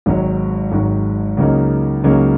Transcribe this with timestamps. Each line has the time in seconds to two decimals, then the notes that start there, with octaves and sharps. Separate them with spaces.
0.06 G#1 G#2 D#3 F#3
0.72 G#1 G#2 D#3 F#3
1.37 C#2 C#3 F#3 A#3 D#4
2.04 C#2 C#3 F#3 A#3 D#4